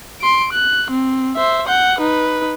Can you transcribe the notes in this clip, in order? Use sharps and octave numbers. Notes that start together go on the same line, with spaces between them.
C6 D7
F#6
C4
C5 E5
F#5 G6
D#4 B4